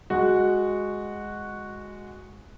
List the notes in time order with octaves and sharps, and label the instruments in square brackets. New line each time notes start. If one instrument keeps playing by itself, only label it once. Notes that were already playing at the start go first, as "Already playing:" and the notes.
[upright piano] G#3 F#4